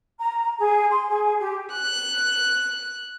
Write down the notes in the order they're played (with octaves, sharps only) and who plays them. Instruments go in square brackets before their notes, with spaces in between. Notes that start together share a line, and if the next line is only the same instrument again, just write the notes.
[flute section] A#5
G#4
C6
G#4
G4
[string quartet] F#6